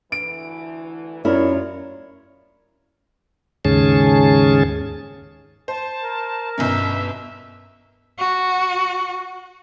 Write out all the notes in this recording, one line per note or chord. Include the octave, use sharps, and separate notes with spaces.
D2 E3 D7
F#2 E4 F4 A#4 C#5 D5
D#2 G#2 C#3 C#4 G#4 A5
C5 A5
A#4
G1 B2 C#4 E5
F#4